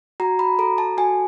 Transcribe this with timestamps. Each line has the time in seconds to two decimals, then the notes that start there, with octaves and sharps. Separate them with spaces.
0.20 F#4 A#5
0.39 B5
0.59 A4 A#5
0.78 A5
0.98 F#4 G#5